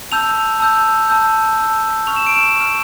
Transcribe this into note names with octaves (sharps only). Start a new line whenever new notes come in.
A5 E6 G6 F7
A5 E6 G6
A5 E6 G6
A5 E6 G6
C#6 F6 F7
E7
D7
E7
C#6 F6